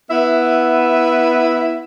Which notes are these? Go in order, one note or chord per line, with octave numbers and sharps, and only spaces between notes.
B3 E4 E5